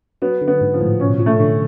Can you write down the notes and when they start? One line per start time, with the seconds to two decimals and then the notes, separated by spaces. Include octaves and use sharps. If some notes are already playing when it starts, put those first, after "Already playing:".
0.22 F#3 B3
0.42 D3
0.48 B3
0.61 G#2
0.74 F3
0.80 A2
1.00 B2 C#4
1.19 F3
1.26 A3
1.40 D3